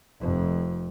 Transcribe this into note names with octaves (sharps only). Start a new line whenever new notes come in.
F1 F2